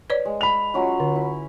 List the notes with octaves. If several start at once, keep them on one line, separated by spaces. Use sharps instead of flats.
B4 C#5 D5
G#3
B5 F7
F#3 C#4 F4
D3
E4